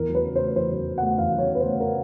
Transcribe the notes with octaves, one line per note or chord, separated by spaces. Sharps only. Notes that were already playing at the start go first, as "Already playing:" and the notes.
Already playing: E2 A#4
F#3
B4
C#3
C5
A3
E2 C5
F#3
C#3
A3 F#5
E2 F5
F#3 C#5
C#3
B4
A3 C5
A#4